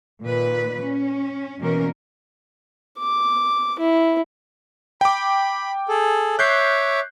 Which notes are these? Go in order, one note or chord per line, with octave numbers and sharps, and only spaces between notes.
A#2 D#3 B4
C#4
B2 E3 A#3 C#4 A#4
D6
E4
G5 B5 D6
G#4 A4
C#5 E5 D6 F#6 G6 C7